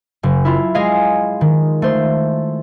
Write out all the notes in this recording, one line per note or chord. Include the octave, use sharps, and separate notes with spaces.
F#1
E4 F4
G#3 G#4 D#5 F5
D#3
A3 C5